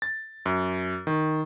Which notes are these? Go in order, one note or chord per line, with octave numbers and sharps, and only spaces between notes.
A6
F#2
D#3